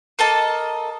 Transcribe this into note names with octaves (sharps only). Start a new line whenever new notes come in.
A#3 A4 D#5 A5